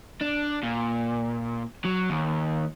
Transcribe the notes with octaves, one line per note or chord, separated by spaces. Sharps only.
D4
A#2
F#3
D#2